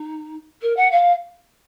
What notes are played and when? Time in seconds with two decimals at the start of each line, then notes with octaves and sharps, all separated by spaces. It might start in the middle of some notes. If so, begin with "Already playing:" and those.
Already playing: D#4
0.61 A#4
0.76 F#5
0.91 F5